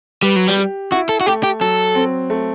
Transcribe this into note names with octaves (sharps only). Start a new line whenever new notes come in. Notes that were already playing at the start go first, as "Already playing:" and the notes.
G3 B4
F#3
G3
G4
E4 F#4
A4
F#4
A3 G4
G4
F#3 A4
C4
A3